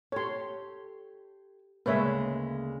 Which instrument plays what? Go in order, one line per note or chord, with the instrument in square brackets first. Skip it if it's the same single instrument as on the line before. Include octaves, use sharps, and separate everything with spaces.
[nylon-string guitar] G4 A4 [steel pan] C#5 C6
[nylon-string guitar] D2 C#3 G#3 [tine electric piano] A#3 [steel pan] B4 C#5 E5